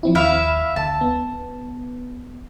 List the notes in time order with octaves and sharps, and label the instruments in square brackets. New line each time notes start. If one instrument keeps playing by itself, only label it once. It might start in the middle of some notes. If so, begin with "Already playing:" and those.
[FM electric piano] F3 C4 E4
[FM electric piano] D#2 B5 [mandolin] E4 E5 F5
[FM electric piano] D2 [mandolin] A5
[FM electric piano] B3